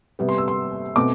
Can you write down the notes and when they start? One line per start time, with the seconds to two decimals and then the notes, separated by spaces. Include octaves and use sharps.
0.19 C3 G3 B3
0.29 C6
0.38 E6
0.48 C6
0.96 B2 A3 C4 D6